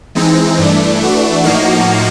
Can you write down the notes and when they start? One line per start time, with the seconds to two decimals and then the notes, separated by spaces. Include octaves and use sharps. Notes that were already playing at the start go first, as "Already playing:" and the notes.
0.15 E3 G#3 C4 D#4
0.58 G2 E3 A3 D4
1.01 E3 A3 D4 F#4
1.43 A2 F3 A#3 D#4 F#4